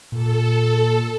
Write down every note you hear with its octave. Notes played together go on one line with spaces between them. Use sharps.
A#2 A4